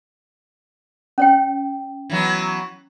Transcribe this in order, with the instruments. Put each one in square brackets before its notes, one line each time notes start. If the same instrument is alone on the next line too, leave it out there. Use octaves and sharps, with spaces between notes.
[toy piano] C#4 C#5 G5
[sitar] E3 F#3 B3